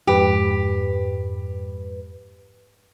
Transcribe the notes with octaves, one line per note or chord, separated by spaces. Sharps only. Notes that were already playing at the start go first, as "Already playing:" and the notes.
F2 G#2 G4 B4